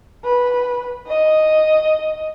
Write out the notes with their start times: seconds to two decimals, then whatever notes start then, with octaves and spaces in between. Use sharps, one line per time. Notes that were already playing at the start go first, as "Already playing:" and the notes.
0.24 B4
1.07 D#5